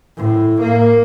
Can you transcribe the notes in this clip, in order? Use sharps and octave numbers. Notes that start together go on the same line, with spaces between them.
A2
A#3